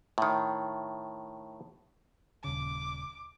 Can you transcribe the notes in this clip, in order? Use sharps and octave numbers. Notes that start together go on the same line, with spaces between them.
A2 D#3
D#1 C#3 D6